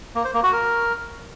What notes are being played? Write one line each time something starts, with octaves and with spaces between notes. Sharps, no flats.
A#3
C5
A#3
F#4
A#4